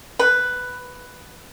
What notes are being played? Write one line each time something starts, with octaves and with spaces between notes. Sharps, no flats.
B4